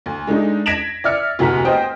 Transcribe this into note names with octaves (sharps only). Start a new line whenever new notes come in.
D2
G#3 A3 D4 D#4
G#6 A#6 B6 D7 E7 F#7
D5 E5 F6 C#7
F1 D2 A2 F#4 A#5 B6
B3 C5 D#5 G5